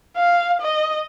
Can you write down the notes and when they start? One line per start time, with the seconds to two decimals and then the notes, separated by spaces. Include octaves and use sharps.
0.17 F5
0.61 D#5